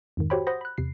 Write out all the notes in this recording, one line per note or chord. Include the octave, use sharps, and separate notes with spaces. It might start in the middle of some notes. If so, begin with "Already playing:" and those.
F2 G#2 D#3
F#4 G4 C5 C#5 G5 B5
C5 F#5 B5 D#6 G6 A#6
B5 F#6
E2 C3 C7